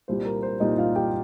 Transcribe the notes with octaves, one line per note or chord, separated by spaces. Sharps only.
C2 A#2 G3 C5
A#4
C5
C2 A#2 G3 D#4 D#5
F4 F5
G4 G5